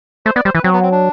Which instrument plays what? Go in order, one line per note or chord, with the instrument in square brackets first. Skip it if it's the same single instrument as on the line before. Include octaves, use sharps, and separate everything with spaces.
[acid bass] A3 [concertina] C5
[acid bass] B3 [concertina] D5
[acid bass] G3 [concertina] C5
[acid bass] E3 [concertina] B4
[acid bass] F#3 [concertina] C4
[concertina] B3
C4
D4